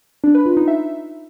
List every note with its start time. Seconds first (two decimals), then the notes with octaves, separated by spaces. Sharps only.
0.24 D4
0.35 B4
0.46 F4
0.57 D#4
0.68 E5